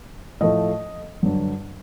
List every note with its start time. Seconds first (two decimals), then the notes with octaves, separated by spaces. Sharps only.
0.41 A2 F3 A3 D#5
1.23 G2 D3 F#3